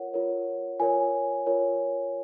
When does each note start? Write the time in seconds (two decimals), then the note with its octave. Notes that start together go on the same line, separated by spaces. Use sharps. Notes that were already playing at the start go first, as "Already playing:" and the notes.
Already playing: F4 A#4 C#5 F#5
0.14 F4 A#4 C#5
0.80 F4 A#4 C#5 G#5
1.46 F4 A#4 C#5